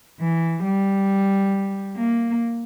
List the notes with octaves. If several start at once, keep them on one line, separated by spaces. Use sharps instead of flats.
E3
G3
A#3